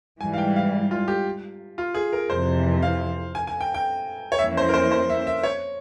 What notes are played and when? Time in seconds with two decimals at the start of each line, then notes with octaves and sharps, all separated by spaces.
0.20 G#2 E3 G3 G#5
0.34 F5
0.38 G5
0.56 F5
0.91 F4
1.08 G4
1.78 F4
1.94 G#4
2.13 A#4
2.30 F2 C3 E3 C5
2.82 F5
3.35 G#5
3.47 G#5
3.61 G5
3.74 G5
4.32 C#5
4.39 F2 E3 A#3 C#4 E4 E5
4.57 C5
4.69 A#4
4.74 C5
4.92 C5
5.10 E5
5.27 E5
5.43 C#5